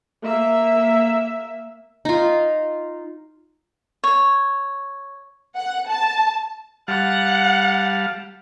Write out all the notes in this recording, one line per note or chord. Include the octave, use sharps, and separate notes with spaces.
A#3 E5
D#4 F4
C#5
F#5
A5
G3 F5 F#5 A5